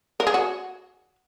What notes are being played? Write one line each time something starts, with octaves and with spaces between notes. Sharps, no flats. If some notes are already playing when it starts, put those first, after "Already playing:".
A#4
G#4
F#4